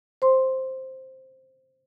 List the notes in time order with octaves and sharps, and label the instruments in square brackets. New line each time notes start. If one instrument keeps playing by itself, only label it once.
[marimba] C5 C6